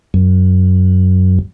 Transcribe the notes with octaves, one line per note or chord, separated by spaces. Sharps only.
F#2